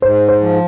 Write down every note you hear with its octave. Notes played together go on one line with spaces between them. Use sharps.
G#2 C5
C5
F3